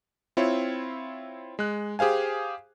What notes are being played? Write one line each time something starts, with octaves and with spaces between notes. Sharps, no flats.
C4 E4 F4 C#5
G#3 F#6
G4 G#4 C5 F5 G#5